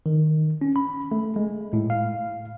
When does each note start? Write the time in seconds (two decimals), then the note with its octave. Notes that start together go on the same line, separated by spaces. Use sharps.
0.06 D#3
0.61 C#4
0.76 B5
1.12 A3
1.36 G#3
1.73 A2
1.90 F5